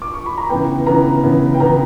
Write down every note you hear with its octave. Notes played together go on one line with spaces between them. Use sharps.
D6
C#6
B5
A#5
C#3 E3 B3 G5
C#3 E3 B3 A#5
C#3 E3 B3
G5
C#3 E3 B3 A#5